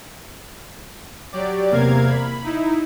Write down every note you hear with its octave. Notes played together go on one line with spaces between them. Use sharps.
F#3 G4 D5
E2 C3 A#3 A#4 F5 G#6
B5
D#4 E4